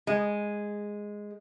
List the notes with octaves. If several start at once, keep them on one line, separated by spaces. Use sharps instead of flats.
G#3